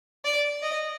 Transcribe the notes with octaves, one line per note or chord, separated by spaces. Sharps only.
D5
D#5